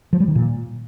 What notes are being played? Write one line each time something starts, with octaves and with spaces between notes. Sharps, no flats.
F3
G3
D#3
A#2